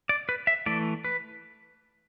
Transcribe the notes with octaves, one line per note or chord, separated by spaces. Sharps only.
D5
B4
E5
E3 A3 D5
B4